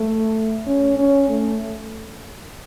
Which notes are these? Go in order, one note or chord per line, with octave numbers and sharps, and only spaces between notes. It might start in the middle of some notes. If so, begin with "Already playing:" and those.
Already playing: A3
C#4
C#4
A3